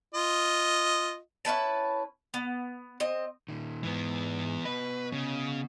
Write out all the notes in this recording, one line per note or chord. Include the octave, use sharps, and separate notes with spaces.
F4 D#5
C#4 E4 B4 A5
B3
C4 D#5
A#2 D#3
G#2 E3 B3
B3 B4 D#5
C#3